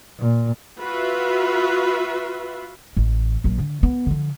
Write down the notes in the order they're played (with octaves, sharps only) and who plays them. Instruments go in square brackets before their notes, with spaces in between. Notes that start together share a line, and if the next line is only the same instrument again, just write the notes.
[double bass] A#2
[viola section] F4 F#4 B4 E5
[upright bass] A1
A#1 F#3
D3
B3
D3 F3